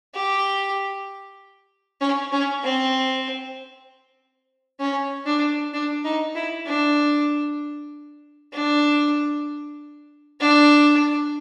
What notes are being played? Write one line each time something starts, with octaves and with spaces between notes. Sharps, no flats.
G4
C#4
C#4
C4
C#4
D4
D4
D#4
E4
D4
D4
D4